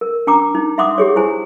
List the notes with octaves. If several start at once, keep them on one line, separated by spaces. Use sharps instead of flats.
A#4
D4 G5 A#5 D6
D#4
E5 F#5 C6 D6 D#6
G4 G#4 C#5
E4 C5 G#5